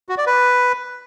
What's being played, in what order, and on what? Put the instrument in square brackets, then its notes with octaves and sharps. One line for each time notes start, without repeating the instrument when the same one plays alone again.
[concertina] F#4
D5
B4